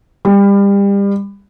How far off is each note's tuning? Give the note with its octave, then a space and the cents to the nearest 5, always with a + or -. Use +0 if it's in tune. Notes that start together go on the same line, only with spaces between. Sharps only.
G3 +30